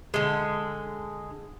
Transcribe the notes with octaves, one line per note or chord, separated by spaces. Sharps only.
D3 G#3